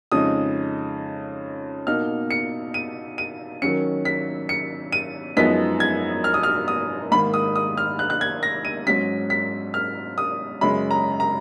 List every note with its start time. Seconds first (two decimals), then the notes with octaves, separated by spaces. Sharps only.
0.12 F2 C#3 G#3 D#4 D#6
1.87 B2 A#3 D#4 F6
2.31 C#7
2.74 D#7
3.18 D#7
3.62 D#3 F#3 C#4 C#7
4.05 B6
4.49 C#7
4.92 D#7
5.37 F#2 F3 G#3 B3 D#4 B6
5.80 G#6
6.24 F6
6.34 D#6
6.43 F6
6.68 D#6
7.11 G#2 D#3 A#3 B5
7.34 D#6
7.56 D#6
7.78 F6
7.99 F#6
8.10 F#6
8.21 G#6
8.43 A#6
8.65 D#7
8.87 G#2 F#3 C#4 B6
9.30 B6
9.74 F6
10.18 D#6
10.61 F#2 C#3 G#3 C#4 B5
10.91 A#5
11.20 A#5